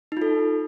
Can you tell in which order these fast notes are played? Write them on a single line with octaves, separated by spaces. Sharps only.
D#4 F4 A4